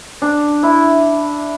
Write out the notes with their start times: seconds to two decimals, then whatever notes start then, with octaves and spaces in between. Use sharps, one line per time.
0.22 D4
0.63 E4